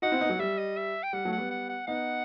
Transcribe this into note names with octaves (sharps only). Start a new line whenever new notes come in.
D#4 F#4 F#5
C4 E4
B3 D#4
F#3
G3 E5
D#5
E5
G5
G3 F#5
F#3 A3
F#5
G3 B3
F#5
F#5
B3 D#4 F#5